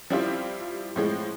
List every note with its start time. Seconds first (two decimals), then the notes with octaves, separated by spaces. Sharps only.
0.10 F3 G3 C4 E4 F4 G4
0.96 A2 F3 G#3